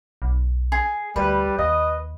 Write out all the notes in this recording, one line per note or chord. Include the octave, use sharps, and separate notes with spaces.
B1
G#4
D2 G3 B4
D#2 D#5